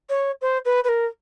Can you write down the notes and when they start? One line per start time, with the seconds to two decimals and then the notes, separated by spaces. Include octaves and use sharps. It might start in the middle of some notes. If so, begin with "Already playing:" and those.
0.09 C#5
0.41 C5
0.65 B4
0.84 B4
0.88 A#4